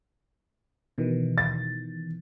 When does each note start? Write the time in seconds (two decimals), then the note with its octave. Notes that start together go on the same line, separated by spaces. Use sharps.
0.98 B2 D#3 E3
1.38 A6